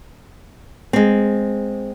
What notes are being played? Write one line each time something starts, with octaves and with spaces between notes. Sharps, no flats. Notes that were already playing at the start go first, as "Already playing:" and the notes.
G#3 C4